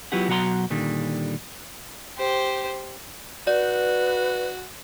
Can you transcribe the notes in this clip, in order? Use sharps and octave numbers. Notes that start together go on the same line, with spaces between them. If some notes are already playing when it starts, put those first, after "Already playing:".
F#3 B3 E4 F4 G4 F#5
B2 F#3 F#4 F#5 A#5 C6
A#2 D3 D#3 G3
G4 C5
F#4 B4 D5